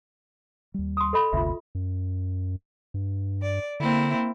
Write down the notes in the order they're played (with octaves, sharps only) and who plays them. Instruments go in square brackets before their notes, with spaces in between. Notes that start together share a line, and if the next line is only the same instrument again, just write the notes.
[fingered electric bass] D#2 G3
[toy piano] C6 D#6
A4 D#5 B5
[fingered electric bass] G1 D2 C3 [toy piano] F4 E5
[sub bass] F#2
G2
[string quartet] D5
[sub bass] D3 [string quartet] A#3 C4 E4